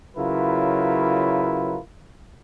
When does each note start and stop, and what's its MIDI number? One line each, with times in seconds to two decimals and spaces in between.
0.17 1.79 49
0.17 1.79 54
0.17 1.79 64
0.17 1.79 65
0.17 1.79 70
0.17 1.79 71